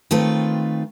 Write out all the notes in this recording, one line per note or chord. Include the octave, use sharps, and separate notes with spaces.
D#3 A3 C4 F4 B4